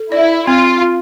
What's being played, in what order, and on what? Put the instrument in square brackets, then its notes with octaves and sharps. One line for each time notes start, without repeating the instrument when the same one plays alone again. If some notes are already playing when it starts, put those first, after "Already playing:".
Already playing: [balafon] A4
[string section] E4 [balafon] D5
[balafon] C4 [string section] F4
[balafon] F4